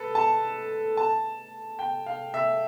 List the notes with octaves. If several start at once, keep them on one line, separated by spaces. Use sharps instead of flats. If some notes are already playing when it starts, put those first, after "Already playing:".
Already playing: A4 B4
A5
A5
G5
F5
E5